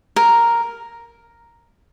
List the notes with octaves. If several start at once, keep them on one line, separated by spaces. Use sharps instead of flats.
A#4